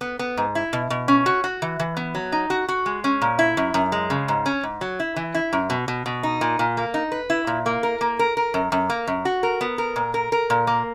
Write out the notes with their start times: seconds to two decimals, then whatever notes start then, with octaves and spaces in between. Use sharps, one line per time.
0.01 B3
0.19 B3
0.37 G#2
0.55 E4
0.73 B2
0.90 B2
1.08 C#4
1.26 F#4
1.44 F#4
1.62 E3
1.80 E3
1.97 B3
2.15 F#3
2.32 D#4
2.50 F#4
2.68 F#4
2.86 G#3
3.04 C#4
3.22 A#2
3.39 E4
3.57 F#2
3.74 F#2
3.92 G#3
4.10 C#3
4.28 G#2
4.46 C#4
4.63 G#2
4.81 F#3
5.00 E4
5.16 E3
5.34 E4
5.53 F#2
5.70 B2
5.88 B2
6.06 B2
6.23 D#4
6.41 A#2
6.59 A#2
6.77 A#3
6.94 D#4
7.12 B4
7.30 E4
7.47 A#2
7.66 A#3
7.83 A#4
8.01 A#3
8.19 A#4
8.37 A#4
8.54 F#2
8.72 F#2
8.90 A#3
9.07 F#2
9.25 F#4
9.43 A#4
9.61 B3
9.78 A#4
9.96 A#2
10.14 A#4
10.32 A#4
10.50 A#2
10.67 A#3